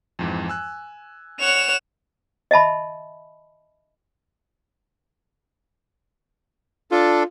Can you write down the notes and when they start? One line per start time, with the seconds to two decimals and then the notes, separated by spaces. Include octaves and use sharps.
0.19 F2 G#2 E3
0.48 G#5 E6 F#6
1.40 C#5 F#5 E7 F7
2.51 D#5 E5 A5 B5
6.92 D4 F4 A4